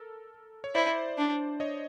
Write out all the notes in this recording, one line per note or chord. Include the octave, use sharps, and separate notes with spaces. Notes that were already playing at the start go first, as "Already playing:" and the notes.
Already playing: A4 A#4
C#5
E4 C5 D5
D4
C#5 D#5